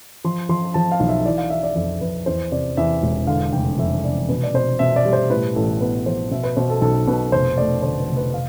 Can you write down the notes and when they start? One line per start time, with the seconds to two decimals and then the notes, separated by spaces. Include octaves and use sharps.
0.24 F3 C6
0.49 F3 C6
0.74 F3 A5
0.92 F5
1.00 B1
1.08 E5
1.25 E3 D5
1.38 F5
1.50 E3 E5
1.63 D5
1.75 F2 E5
2.01 F2 B4
2.26 E2 C5
2.52 C3 D5
2.77 E2 E5
3.03 E1
3.27 D3 F5
3.53 F1 G5
3.78 F2 E5
4.04 F1 D5
4.29 B2 B4
4.43 D5
4.54 B2 C5
4.79 B2 E5
4.96 D5
5.05 G3
5.13 C5
5.30 A2 B4
5.55 A1 A4
5.81 B3 B4
6.06 F3 C5
6.31 B2 E5
6.43 B4
6.57 B2 C5
6.70 A4
6.81 B1 A4
7.07 B2 B4
7.32 F1 C5
7.58 A3 D5
7.83 D3 C5
7.99 B4
8.09 F1
8.17 B4
8.34 F5